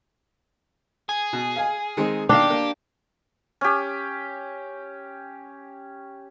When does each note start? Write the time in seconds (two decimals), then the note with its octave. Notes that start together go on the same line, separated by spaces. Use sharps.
1.09 G#4
1.33 B2
1.56 F5 G#5
1.97 D#3 G#3 C4
2.29 B2 D#3 A#3 D4 G4 F5
2.50 A#3
3.61 C#4 G4